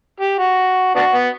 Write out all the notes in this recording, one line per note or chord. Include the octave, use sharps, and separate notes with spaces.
G4
F#4
B3 D4 F#4
B3